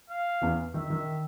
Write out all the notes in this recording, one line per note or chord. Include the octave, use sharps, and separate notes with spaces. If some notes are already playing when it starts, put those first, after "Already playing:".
F5
E2 E3
D#3 E5
D#3